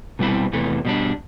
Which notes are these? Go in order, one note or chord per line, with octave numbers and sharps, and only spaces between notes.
B2 G3 C4 E4
E2 C3 E3 A3
B2 G3 D4